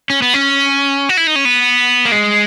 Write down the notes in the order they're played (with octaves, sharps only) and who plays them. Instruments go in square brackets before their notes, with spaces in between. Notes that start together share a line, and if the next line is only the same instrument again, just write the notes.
[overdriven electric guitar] C#4
B3
C#4
F#4
E4
D#4
C#4
B3
A#3
G#3